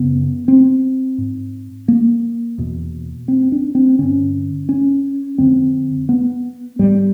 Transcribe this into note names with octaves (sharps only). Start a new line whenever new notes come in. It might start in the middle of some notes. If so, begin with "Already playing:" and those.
Already playing: F#2 C#3 B3
C4
G#2
A#3
E2 B2
C4
D4
C4
G2 D3 C#4
C#4
F2 D3 C4
B3
G#2 G3